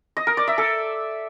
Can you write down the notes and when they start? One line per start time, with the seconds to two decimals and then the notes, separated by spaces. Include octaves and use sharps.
0.17 D#5
0.27 A#4
0.37 D5
0.48 E5
0.58 A4